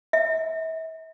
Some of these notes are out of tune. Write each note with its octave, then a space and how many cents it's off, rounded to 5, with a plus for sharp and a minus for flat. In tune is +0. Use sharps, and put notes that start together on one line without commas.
E5 -40